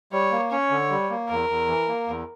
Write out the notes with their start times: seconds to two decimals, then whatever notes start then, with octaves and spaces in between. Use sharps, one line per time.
0.12 G3 C#5
0.31 A#3
0.51 C#4 C#5
0.70 D3
0.90 G3
1.10 A#3
1.29 E2 A#4
1.49 E2
1.68 E3
1.88 A#3
2.07 E2